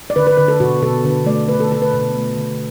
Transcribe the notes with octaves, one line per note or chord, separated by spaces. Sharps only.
D5
D3 B4
B4
D3 B4
A4
B2 F#4
B2 A4
D3 B4
A3 D5
D3 B4
A4
D3 A4
B4
B2
A3
D3